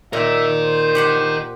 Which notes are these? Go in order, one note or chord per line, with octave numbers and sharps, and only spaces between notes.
A#2 A#4 D#5 E5
C5
G4 F#5 C6